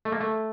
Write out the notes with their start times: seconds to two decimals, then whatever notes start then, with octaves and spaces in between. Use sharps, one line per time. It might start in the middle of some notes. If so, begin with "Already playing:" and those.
0.05 A3
0.12 A#3
0.20 A3